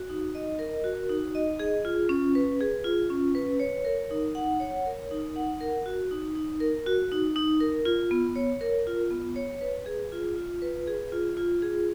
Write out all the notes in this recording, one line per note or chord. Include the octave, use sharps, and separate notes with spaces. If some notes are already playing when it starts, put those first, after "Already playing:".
Already playing: F#4
D#4
D#5
A#4
F#4
D#4
D#5
G#4
F4
C#4
B4
G#4
F4
C#4
B4
C#5
A#4
D#4
F#5
C#5
A#4
D#4
F#5
A#4
F#4
D#4
D#4
A#4
F#4
D#4
D#4
A#4
F4
B3
C#5
A#4
F4
B3
C#5
B4
G#4
F4
F4
B4
G#4
F4
F4
G#4